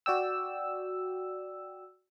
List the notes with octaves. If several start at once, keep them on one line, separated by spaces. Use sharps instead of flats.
F#4 D5 G5 E6